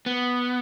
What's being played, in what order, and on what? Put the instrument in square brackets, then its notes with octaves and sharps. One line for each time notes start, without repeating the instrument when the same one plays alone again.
[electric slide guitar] B3